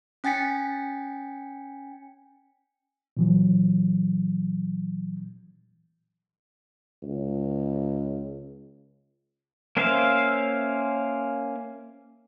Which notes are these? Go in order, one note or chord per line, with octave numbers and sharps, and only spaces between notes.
C#4 G5 G#5 A6 B6 C#7
A#2 E3 F#3
C#2
A#3 C#4 C5 E5 F5